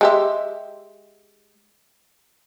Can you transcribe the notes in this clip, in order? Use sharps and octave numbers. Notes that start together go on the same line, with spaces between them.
G#3 G4 E5